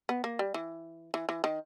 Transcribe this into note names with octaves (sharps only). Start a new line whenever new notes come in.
B3
A#3
G3
E3
E3
E3
D#3